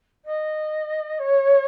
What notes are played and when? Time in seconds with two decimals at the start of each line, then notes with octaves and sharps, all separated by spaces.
0.25 D#5
1.19 C#5